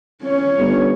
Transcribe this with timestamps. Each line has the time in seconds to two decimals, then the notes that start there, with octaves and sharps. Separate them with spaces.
0.23 C#4 C#5
0.59 G1